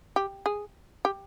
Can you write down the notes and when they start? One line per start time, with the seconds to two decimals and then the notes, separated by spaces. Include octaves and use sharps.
0.16 G4
0.46 G#4
1.05 G4